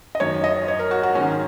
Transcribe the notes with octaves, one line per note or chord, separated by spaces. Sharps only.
D#5
F#2 D#3 C#5
D#5
C#5
A#4
F#4
F#4
G#2 D#3 C#4